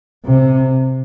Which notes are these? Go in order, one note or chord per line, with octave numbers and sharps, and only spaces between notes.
C3